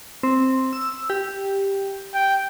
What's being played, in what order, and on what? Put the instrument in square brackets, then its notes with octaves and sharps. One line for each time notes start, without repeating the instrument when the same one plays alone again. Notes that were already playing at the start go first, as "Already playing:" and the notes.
[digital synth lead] C4
E6
G4
[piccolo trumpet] G5